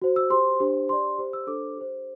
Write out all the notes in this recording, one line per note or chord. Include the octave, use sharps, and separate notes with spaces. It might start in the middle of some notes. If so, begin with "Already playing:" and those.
F#4 C5
E6
G4 C5 C6
D4 G4 C5
G4 D5 C6
G4 C5
E6
D4 A4 C5 D6
G4 C5